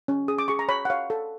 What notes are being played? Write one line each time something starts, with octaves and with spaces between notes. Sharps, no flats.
C#4
G#4 D#6
D6
G#4 C#6
A#5
C#5 B5
F#5
C#5 F5
A4